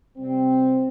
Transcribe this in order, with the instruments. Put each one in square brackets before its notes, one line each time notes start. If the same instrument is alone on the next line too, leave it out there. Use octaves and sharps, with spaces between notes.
[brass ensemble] C3 G3 C4